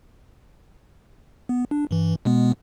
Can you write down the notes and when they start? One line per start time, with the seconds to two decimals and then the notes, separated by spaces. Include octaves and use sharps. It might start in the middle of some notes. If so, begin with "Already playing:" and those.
1.49 B3
1.71 D4
1.91 G2 E3
2.25 B2 G#3 B3